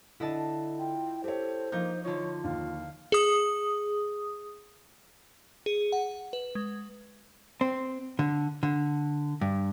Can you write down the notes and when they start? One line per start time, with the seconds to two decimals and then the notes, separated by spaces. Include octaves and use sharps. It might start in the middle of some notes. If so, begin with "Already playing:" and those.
0.20 D3 E4 D#5 A5
0.79 F4 G5
1.24 G4 A4 C5 C#5
1.72 F3 A#3 D#4 G6
2.04 D3 D#4 F4 C#5
2.44 D#2 F5
3.12 G#4 D#6
5.66 G#4
5.92 F#5
6.33 B4
6.55 G#3
7.61 C4
8.19 D3
8.63 D3
9.41 G2